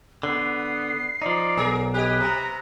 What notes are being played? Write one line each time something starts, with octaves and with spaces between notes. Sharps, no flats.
D3 B3 C7
F3 D#4 D5
B1 G#4 A#4
G4 B4 D#5 G#5
C3 A#5